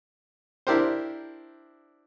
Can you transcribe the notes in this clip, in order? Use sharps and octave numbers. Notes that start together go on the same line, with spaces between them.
D4 E4 G4 A#4 C5